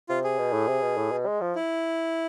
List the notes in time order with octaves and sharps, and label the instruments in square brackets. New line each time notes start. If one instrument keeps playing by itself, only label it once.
[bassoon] C3 [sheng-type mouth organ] F4
[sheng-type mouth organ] G#4
[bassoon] B2
A2
C3
B2
A2
B2
G#3
F3
[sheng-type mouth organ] E4